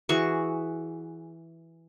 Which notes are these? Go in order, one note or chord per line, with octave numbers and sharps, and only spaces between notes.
E3 F#4 G#4 C#6